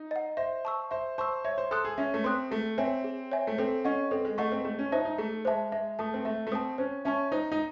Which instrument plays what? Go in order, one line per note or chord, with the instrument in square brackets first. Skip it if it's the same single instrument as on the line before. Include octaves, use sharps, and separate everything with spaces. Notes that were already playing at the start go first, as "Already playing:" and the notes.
Already playing: [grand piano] D#4
[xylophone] D#5 F#5
[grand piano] C5 [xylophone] E5
[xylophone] A5 C#6 E6
[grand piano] C5 [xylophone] E5
[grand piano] C5 [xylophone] A5 C#6 E6
[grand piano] C#5 [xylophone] E5
[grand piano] C5
[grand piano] A4 [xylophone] C6 D#6 F#6
[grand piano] G#4
[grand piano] C#4 [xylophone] E5
[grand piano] A3
[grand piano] C4 [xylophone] C6 D#6 F#6
[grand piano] A3 [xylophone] G#4
[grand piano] C4 [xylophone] C#5 E5 G#5
[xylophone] G#4
C#5 E5 G#5
[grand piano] A3
[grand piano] C4 [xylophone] A4
[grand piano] C#4 [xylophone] D#5 F#5 C#6
[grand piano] C4 [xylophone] A4
[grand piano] G#3
[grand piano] A3 [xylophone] D#5 F#5 C#6
[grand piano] C4
[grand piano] A3 [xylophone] G#4
[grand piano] C#4
[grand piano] D#4 [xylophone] C5 E5 A5
[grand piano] D#4
[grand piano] A3 [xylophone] G#4
[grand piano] G#3 [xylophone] C5 E5 A5
[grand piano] G#3 [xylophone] E5
[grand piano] A3 [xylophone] A5 D#6
[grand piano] C4
[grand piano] A3 [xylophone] E5
[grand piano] A3
[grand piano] C4 [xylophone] A5 D#6
[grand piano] C#4 [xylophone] C5
[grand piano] C#4 [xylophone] E5 A5 C#6
[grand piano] D#4 [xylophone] C5
[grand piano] D#4